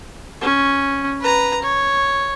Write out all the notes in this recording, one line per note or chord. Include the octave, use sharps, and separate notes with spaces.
C#4
B4 A#5
C#5